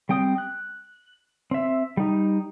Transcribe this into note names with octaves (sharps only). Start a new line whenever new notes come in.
G3 C4 G5 D#6
F#6
C4 E5
G3 D#4